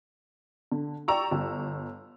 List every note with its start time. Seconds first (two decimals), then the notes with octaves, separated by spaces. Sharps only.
0.72 D3
1.08 D5 G5 A#5 C#6 E6
1.31 G1